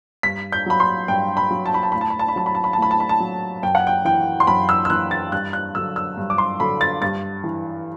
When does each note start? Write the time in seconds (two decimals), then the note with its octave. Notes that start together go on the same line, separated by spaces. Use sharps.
0.23 G2 B6
0.52 G6
0.66 F#3 B5
0.80 C6
1.08 G2 G5
1.37 B5
1.51 F#3
1.66 A5
1.74 B5
1.83 A5
1.92 A2 B5
2.01 A5
2.10 B5
2.19 A5
2.28 B5
2.36 F#3 A5
2.46 B5
2.55 A5
2.64 B5
2.73 A5
2.78 A2 B5
2.91 A5
3.00 B5
3.09 A5
3.20 F#3
3.63 F#2 G5
3.75 F#5
3.87 G5
4.05 E3 G5
4.40 C6
4.47 F#2 B5
4.69 E6
4.85 E6
4.90 E3 F#6
5.11 A6
5.32 G2 F#6
5.53 F#6
5.75 D3 F#3 E6
5.96 E6
6.17 G2
6.30 D6
6.38 C6
6.60 D3 F#3 B5
6.81 A6
7.02 G2 A6
7.44 E3